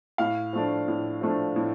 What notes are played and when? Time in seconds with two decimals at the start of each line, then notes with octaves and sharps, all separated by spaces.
0.18 A2 F5
0.53 F3 A3 D4
0.88 A2
1.21 F3 A3 D4
1.56 A2